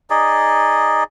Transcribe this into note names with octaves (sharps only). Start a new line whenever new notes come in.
D#4 G#4 D5 D#5